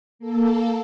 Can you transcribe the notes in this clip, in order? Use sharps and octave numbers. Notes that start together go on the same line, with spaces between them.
A#3 A4